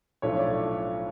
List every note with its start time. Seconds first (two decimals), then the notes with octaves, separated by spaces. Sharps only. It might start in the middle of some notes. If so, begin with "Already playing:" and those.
0.22 B1 A2 F3 A3 D4 C#5
0.39 D5